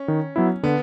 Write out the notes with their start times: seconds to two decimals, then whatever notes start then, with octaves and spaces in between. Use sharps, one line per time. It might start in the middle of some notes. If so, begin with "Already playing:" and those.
Already playing: C#4
0.08 D#3
0.36 F#3 B3 E4
0.63 D3 B3